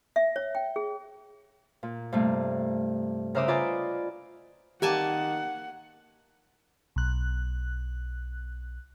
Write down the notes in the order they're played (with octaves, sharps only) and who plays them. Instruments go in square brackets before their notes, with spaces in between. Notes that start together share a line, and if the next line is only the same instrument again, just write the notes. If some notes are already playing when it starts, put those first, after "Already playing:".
[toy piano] E5
C#5
G5
G#4
[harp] A#2
G2 C3 A3 A#3
C#3 A#4 C5 E5 D6 D#6
F4 B4 D5 D#5 G#5
[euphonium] D#3 [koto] A#3 G#5 A5 [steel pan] G4 [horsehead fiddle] F#5
[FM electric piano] B1 F#6